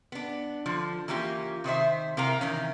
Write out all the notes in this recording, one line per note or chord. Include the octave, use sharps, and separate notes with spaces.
B3 D4
D3 F3
E3 A#3 C#4 F4 G4
C3 D#3 C5 E5
C3 E4 A#4 F5 A#5
D#3 E3 C#4